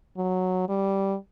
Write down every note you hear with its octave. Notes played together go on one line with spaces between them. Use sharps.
F#3
G3